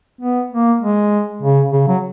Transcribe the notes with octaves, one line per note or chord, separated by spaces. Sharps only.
B3
A#3
G#3
C#3
C#3
F#3